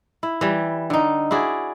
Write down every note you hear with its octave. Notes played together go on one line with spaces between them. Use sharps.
E4
E3 G3
D3 D#4
E4 F#4 G#4 D5